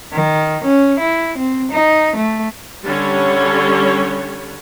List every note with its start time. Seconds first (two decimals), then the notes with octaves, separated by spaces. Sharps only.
0.13 D#3
0.64 C#4
0.99 E4
1.38 C4
1.71 D#4
2.16 A3
2.83 D3 G3 C#4 C#5